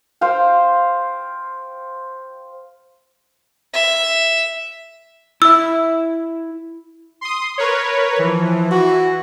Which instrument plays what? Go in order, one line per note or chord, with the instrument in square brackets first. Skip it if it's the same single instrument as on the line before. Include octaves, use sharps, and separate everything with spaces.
[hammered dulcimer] C5 F5 G5
[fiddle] E5
[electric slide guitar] E4 E5 [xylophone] E6
[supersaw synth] C6 D#6
A#4 B4 C#5
[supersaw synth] E3 [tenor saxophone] F3
[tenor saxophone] F#4